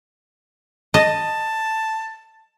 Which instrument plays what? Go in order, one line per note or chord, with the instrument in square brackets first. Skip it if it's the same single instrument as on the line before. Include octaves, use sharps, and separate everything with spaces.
[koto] D#5 [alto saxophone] A5